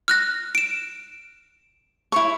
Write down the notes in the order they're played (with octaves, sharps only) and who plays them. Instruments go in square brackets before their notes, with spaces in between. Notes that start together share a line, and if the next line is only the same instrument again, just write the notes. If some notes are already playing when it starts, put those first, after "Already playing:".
[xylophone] F6 F#6 A#6
D7 E7
[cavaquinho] E4 C#5 C#6